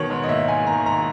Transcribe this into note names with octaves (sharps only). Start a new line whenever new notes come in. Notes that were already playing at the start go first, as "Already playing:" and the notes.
Already playing: B2 D#3 C#5
G#2
D#5
A#3 E5
G#2 G#5
D#3 A#5
G#2 A#5